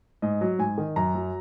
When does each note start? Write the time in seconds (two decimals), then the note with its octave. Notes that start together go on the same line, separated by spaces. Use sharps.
0.22 G#2 D#5
0.41 F#3
0.59 G#2 G#5
0.78 D#3
0.96 F#2 A#5
1.15 F#3